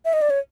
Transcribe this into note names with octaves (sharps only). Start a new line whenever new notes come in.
E5
D#5
D5
C#5